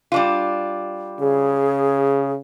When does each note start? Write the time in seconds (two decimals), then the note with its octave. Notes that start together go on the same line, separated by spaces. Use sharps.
0.12 G3 D4 F4
1.20 C#3 G#4